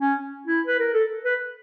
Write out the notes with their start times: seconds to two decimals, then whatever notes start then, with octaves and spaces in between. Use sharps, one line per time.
0.01 C#4
0.47 E4
0.67 B4
0.80 A#4
0.94 A4
1.25 B4